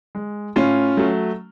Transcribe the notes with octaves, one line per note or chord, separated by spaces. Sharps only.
G#3
A2 C#4 F4
F#3 A3